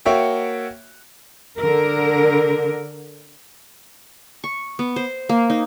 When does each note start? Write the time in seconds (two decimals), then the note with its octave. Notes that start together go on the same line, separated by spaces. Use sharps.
0.06 A#3 F#4 C#5 E5 G5
1.58 D3 A#4
4.44 C#6
4.79 B3
4.96 C5
5.29 A#3
5.50 D#4